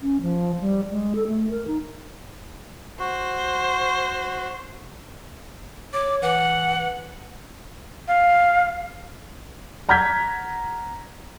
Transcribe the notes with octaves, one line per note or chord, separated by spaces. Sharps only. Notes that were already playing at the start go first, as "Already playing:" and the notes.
C#4
F3
G3
G#3
A4
A3
A#4
D#4
F#4 C5
C#5 D6
E3 F#5
F5
F#5 A#5 F6 G6 G#6 B6